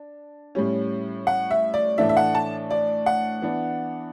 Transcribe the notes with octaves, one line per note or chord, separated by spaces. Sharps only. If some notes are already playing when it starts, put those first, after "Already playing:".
Already playing: D4
A2 G3 C#4
F#5
E5
D5
A2 E3 A3 D4 E5
E5
F#5
A5
D5
F#5
E3 B3 D4